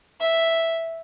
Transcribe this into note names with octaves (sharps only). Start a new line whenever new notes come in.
E5